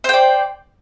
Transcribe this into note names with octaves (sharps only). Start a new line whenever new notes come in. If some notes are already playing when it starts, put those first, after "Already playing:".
C5 D5 G5